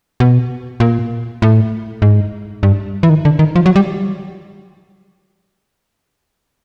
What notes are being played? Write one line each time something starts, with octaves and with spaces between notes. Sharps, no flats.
B2
A#2
A2
G#2
G2
E3
D#3
D3
D#3
F3
F#3
G3